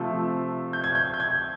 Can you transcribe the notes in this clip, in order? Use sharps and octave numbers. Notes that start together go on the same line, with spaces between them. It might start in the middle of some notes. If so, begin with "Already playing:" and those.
Already playing: C3 F3 A3
G6
G#6
G6
G6
G#6